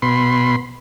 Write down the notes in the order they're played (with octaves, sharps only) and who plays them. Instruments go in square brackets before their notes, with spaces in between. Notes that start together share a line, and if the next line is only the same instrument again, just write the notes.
[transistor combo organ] B2 B5 C6